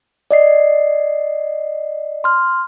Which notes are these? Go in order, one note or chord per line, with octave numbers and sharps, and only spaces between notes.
D5 D#5 C7
C6 F6